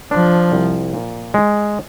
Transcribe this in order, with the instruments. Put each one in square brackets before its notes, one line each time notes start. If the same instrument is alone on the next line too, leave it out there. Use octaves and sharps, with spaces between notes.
[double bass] F3 [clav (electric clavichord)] D4
[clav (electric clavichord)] C2
A#2
G#3